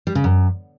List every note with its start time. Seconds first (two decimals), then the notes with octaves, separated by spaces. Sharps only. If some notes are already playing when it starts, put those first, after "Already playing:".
0.07 G3
0.15 C#3
0.24 F#2